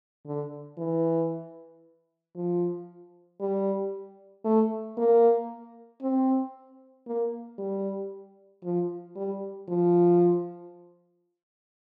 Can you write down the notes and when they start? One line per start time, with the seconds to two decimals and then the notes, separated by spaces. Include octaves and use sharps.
0.26 D3
0.77 E3
2.35 F3
3.40 G3
4.45 A3
4.97 A#3
6.02 C4
7.07 A#3
7.58 G3
8.64 F3
9.16 G3
9.68 F3